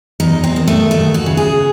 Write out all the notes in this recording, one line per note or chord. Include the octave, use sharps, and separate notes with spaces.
E2 D#4
C4
D#3
A3
D#2 A3
F#4
C#3
G#4